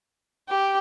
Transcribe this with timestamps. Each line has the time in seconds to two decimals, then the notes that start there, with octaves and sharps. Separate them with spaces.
0.49 G4